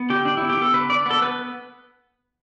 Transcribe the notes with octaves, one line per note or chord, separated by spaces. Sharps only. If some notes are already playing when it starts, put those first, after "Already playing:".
Already playing: B3
D3 G4
D3 D4
B3 E4
G4
B3 A4
D3 B4
D3 D5
B3 A4
B3 B4